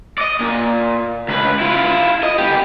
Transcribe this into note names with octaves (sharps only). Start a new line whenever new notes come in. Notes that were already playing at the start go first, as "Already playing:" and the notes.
D5 D#5
A#2
C#2 B4
E4 F4
D#5
B3 G4